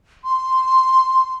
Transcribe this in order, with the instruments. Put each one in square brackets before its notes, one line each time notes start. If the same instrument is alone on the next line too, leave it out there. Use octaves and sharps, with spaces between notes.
[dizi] C6